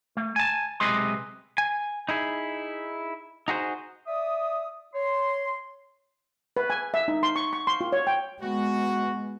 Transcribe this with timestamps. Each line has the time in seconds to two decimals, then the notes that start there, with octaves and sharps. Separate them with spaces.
0.17 A3
0.36 G#5 A5
0.80 B1 C3 G#3 B4 D#5 C6
1.58 G#5
2.09 D#4 E4 G#4
3.48 D#4 F#4 G#4 C5
4.07 D5 E5 D#6
4.95 C#5 C6
6.57 B4
6.70 G#5
6.94 E5
7.08 D#4
7.23 C6
7.36 C#6
7.53 C#6
7.67 C6
7.81 F4
7.92 C#5
8.07 G5
8.42 G#3 B3 F#4